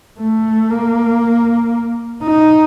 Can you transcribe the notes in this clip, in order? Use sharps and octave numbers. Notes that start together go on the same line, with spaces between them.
A3
A#3
D#4